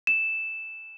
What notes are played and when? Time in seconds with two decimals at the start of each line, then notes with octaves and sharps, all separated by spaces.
0.07 E7